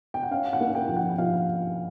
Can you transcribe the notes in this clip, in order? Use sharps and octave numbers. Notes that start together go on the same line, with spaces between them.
G5
F#5
C#4 F5
F#5
A#3
G5
F3
F#5
F3 F5